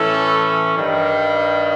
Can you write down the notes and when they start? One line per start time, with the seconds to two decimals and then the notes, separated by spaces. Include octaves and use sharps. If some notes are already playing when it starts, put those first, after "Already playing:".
Already playing: A2 E3 A3 C#4 A4
0.76 G2 D#3 G3